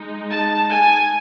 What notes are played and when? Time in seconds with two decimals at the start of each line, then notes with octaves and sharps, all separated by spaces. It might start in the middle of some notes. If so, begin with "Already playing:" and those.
Already playing: G#3 D#4
0.30 A5
0.71 G#5